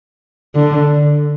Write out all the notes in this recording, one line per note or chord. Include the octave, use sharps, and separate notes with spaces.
D3